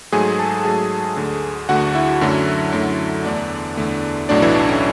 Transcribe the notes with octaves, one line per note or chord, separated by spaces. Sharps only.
G#2 F#3 A3 G#4 G#5
A4 A5
G#2 F#3 A3 G#4 G#5
D2 D3 A3
D2 D3 A3 F#4 F#5
E4 E5
F#2 D3 F#3 A3
F#2 D3 F#3 A3
E2 D3 A3 D4 D5
E2 D3 A3
B1 A2 F#3 A3 D4 D5
E3 E4
D4
C#4